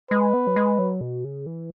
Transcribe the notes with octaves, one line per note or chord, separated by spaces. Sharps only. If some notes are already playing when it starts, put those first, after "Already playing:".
G#3 B4
B3
F#3
G#3
F#3
B2
C#3
E3